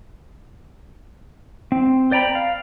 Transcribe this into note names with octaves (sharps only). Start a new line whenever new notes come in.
C4
C5 D5 G5 A#5 B5
F5